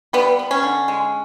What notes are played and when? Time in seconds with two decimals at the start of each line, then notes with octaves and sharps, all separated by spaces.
0.13 G3 B3
0.39 B3
0.51 C#4
0.63 D3
0.88 G#3